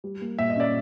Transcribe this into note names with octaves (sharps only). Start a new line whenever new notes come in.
G3
A#3
A#2 E5
D#5
C#4 D5 E5